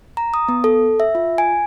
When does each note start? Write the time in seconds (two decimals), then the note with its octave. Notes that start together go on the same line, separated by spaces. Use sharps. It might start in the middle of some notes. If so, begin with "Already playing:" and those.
0.17 A#5
0.34 D#6
0.48 B3
0.64 A4
1.00 E5
1.15 F4
1.38 G#5